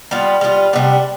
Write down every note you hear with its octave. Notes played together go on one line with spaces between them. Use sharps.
G3 B3 F4
G3 B3 F4
C3 G3 B3 D4